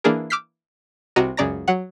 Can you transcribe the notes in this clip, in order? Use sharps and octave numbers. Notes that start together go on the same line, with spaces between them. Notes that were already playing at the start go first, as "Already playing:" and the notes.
E3 A#3 D4 G#4 A#4
D6 E6 F6 G6 B6 C7
C2 C3 F#4 D#5 A#5 D#7
C#2 F#2 C#3 D5 A#5 A#6
F#3 F#5